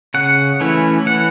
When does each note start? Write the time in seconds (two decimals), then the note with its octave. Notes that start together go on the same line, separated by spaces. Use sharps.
0.14 C#3 F#5
0.60 E3 A3 C#4 E4
1.06 E3 F#5